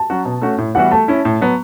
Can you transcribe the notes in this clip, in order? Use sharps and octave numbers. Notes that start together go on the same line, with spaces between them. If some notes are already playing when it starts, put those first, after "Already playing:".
Already playing: A5
F#3 C#4 F#4
B2
A3 C#4 F#4
A2
E3 G3 B3 F#4 F#5
A3 A5
C#4 E4
A2
F#3 B3